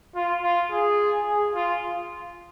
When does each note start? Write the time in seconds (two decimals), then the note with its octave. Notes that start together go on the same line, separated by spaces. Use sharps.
0.16 F4
0.43 F4
0.71 G#4
1.27 G#4
1.55 F4